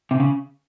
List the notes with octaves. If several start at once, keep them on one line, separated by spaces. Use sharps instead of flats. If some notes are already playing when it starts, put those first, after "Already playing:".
C3
C#3